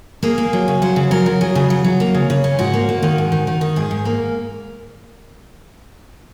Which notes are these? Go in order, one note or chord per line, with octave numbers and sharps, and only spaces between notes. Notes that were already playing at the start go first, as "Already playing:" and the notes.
A#3 G#4
A#3
F#3
C#3
F#3 C5
C#3
F#3 A#4
F#3
F#3 G#4
C#3
F#3
F#3
A#3
C#3
C#3
C#4
G#2 F#4
A#3
A#3
D#3
G#2
D#3
D#3
D#3
G#2 G#4
G#2
A#3 A#4